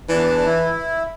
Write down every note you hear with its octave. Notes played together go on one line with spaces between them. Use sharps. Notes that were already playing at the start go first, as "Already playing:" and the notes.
E2 E3 D4 A5
E4